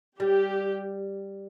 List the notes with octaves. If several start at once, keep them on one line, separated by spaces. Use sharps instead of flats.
G3 G4